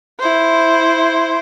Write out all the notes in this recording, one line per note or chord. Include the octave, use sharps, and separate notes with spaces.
E4 C5